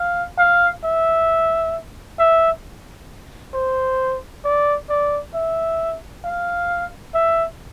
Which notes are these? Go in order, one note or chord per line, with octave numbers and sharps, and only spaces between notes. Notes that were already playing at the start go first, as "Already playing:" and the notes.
Already playing: F5
F5
E5
E5
C5
D5
D5
E5
F5
E5